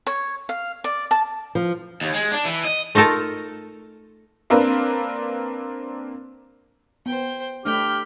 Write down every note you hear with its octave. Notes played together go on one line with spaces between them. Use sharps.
C#5
F5
D5
A5
F3
D#2
G#3
D4
E3
D#5
A3 D#4 F4 A4 A#4
A#3 C4 D4 A#4 B4
B3 C5 G5
A3 D4 G4 G5 B5 F6